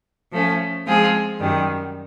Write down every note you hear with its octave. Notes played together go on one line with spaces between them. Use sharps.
F3 A3 C#4
F3 G#3 C4 F4 G#4
F#2 D#3 G3